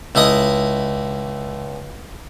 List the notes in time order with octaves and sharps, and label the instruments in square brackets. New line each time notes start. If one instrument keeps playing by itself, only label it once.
[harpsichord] C#2 E4 A4 D#5 D#6